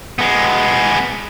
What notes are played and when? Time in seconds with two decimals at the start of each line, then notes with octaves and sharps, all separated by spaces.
0.19 G#3 B3